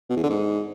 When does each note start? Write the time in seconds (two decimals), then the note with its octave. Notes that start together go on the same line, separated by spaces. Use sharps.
0.10 B2
0.16 E2
0.23 D3
0.30 G#2